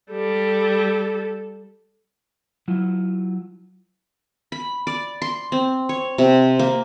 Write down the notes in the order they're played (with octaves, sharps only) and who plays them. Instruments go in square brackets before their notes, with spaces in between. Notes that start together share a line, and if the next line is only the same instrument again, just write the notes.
[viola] G3 A4
[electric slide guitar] F#3 E4 F4
[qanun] B5
D5
C6
C4
C#5
C3
A#3